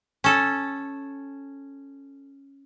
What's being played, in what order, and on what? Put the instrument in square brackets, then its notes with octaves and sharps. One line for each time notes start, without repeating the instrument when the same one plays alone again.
[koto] C#4 A4